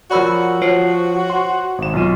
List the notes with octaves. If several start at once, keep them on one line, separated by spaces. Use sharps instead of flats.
F3 F#4 A#4 C#5 D5 B5 E6
F3 C5 C#5 C7
F#5 C6
G#1 E7
B1 F4 D#7